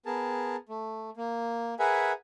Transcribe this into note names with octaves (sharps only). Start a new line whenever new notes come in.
B3 G#4 A#4 A5
A3
A#3
G#4 A#4 B4 E5 F#5 G#5